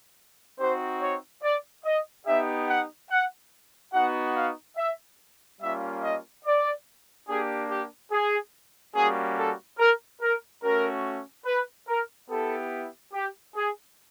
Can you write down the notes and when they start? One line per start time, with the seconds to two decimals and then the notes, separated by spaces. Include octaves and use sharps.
0.59 C4 D#4 F#4 C5
1.01 C#5
1.43 D5
1.85 D#5
2.27 B3 D#4 G4 E5
2.69 F#5
3.11 F#5
3.93 B3 D#4 F#4 F#5
4.36 F5
4.78 E5
5.61 G3 A#3 C#4 F4 E5
6.02 D#5
6.45 D5
7.28 A#3 D4 G4 G#4
7.70 G4
8.12 G#4
8.95 G3 A#3 C#4 F#4 G#4
9.38 A4
9.79 A#4
10.22 A#4
10.63 A3 C#4 F#4 A#4
11.46 B4
11.88 A#4
12.30 B3 E4 G4 A4
13.13 G4
13.56 G#4